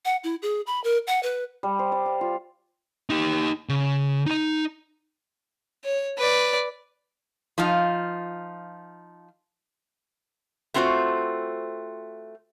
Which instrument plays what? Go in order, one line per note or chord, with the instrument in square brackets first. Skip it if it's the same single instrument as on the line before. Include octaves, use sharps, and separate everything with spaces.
[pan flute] F#5
E4
G#4
B5
A#4
F#5
B4
[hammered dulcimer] G3
C5
D5
F5
F4
[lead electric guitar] D#4 G4
C#3
D#4 A#5
[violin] C#5
B4 D5
[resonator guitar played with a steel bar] F3 D#4 F4
A3 C4 F4 F#4 C5